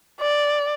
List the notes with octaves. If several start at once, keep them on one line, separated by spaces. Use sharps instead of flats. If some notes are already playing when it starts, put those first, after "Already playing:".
D5